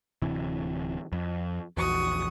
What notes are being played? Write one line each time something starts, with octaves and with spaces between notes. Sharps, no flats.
D1 C3 E3
F2
A#1 E2 F#4 C#6 D#6